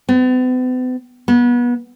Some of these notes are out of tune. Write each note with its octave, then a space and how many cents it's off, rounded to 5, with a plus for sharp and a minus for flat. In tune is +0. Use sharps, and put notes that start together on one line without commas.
B3 +45
B3 -30